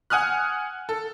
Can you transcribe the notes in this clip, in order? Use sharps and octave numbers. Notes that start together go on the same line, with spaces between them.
F#5 G#5 D#6 F6 F#6
A4